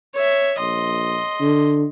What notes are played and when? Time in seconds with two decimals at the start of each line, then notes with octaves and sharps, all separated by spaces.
0.15 C#5 E5
0.58 A#1 D#5 C6
1.41 D3